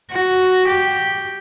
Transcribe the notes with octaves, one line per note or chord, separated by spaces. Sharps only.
F#4
G4